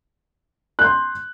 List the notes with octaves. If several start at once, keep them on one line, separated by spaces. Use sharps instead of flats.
C6 F#6 G6